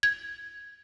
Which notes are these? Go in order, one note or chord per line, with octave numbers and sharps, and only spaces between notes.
G#6